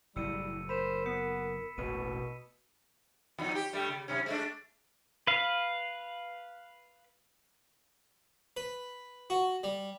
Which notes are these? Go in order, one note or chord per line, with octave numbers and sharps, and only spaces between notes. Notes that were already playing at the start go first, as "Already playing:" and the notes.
F#1 A2 G3 E4 E6 C#7 D#7
A#4 C5 B5 B6 E7
B3 D#6 B6 C#7
E1 A1 E2 B2 B4 D#7
E2 F#3 D#4
G4
G2 G3 A3
C#3
F#2 C3 C#4
G#3 A3 D4
B4 F5
B4
F#4
G3